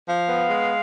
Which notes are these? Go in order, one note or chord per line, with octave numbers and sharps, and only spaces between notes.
F3 F5
B3
G#3